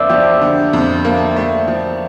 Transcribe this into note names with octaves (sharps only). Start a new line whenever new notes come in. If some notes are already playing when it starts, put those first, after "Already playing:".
Already playing: F2 D3 A#3 C5 D5 E5
F3 G4
D3
F2
A#3
A3
F3